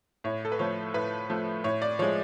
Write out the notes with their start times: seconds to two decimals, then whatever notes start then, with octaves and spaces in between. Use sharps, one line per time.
0.24 A2 C#5
0.45 A4
0.52 B4
0.59 F3 A3 C#5
0.94 A2 B4
1.29 F3 A3
1.64 A2 C#5
1.82 D5
1.99 F3 G#3 C#5